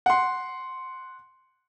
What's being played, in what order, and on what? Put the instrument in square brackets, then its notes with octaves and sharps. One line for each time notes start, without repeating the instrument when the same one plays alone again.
[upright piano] F#5 C6